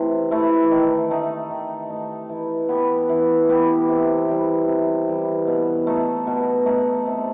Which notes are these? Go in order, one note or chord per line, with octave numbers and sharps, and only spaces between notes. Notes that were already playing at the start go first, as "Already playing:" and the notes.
Already playing: C3 E3 A3 E4
E3 A3 E4
D#3
A3 D#4
D#3
A3 D#4
E3
B3 E4 G4
E3
B3 E4 G4
C3
E3 G3
C3
E3 G3
B2
A3 D#4 A4
B2
A3 D#4 A4
C3